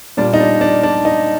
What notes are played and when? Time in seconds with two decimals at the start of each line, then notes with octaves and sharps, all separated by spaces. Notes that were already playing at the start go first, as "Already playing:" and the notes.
0.17 A#2 G3 D4
0.34 D#4
0.40 D4
0.61 D4
0.83 D4
1.05 D#4